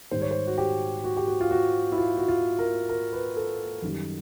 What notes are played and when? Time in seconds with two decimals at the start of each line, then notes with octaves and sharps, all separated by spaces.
0.11 G#2 D#3 G3 C5
0.22 C#5
0.31 C5
0.47 F#4
0.58 G4
1.04 F#4
1.17 G4
1.27 F#4
1.41 F4
1.51 F#4
1.92 E4
1.98 F4
2.18 F#4
2.28 F4
2.59 A#4
2.89 A#4
3.13 B4
3.36 A4
3.82 F#2 D#3 G3